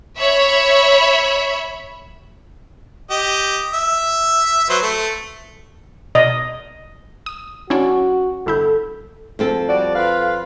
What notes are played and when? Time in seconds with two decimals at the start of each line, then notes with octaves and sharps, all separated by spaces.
0.18 C#5 E5 B5
3.11 G4 D#5
3.73 E5
4.69 F#3 B4 C5
4.82 A3
6.15 B2 D5 D#5
7.26 D#6
7.70 C#4 D4 E4 F#4
8.46 G1 E4 A4 G6
9.39 F2 C4 A4
9.68 G3 F#4 D5
9.96 F4 B4 F5